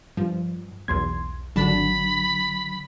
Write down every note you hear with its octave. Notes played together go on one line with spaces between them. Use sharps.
G2 F3
B1 E2 C6 G#6
G#1 D3 F#3 D4 A5 B5